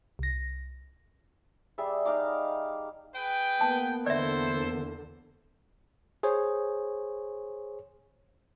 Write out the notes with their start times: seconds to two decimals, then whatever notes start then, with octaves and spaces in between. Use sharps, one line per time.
0.19 C2 A#6
1.78 G3 G#4 D5 E5
2.05 D#4 F5 A#5 D6
3.15 G#4 B4 G5
3.61 A#3 B3 A5
4.06 E2 D3 E4 A4 C5 D5 E5
6.23 G#4 C5 C#5